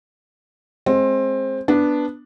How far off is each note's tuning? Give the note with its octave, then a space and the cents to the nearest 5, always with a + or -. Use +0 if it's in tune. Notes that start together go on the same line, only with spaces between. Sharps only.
G#3 +15 C4 +20
B3 +0 D4 +0